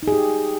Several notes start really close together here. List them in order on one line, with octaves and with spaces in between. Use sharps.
D#4 G#4 G4